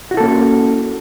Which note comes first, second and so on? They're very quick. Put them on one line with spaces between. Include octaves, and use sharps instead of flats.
F#4 E4 A4 A#3 C#4